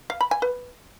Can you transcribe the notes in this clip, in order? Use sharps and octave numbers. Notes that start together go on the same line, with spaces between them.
F5
B5
G#5
B4